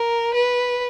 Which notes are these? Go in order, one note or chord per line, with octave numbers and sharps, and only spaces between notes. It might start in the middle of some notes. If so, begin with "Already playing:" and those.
Already playing: A#4
B4